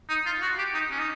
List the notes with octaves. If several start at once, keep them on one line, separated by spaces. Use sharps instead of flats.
D#4
F4
F#4
G4
D#4
C#4
D#4